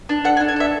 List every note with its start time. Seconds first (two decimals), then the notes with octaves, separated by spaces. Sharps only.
0.09 D4
0.24 A4 F#5
0.37 G#5
0.40 D4
0.48 G#5
0.56 A4 E5